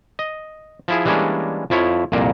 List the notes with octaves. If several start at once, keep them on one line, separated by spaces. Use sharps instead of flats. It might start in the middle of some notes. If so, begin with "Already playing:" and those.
D#5
F3 E4 G#4
E3 G3 G#3 A#3 C#4 D4
F2 F3 E4 C#5
C2 F2 A#2 A#3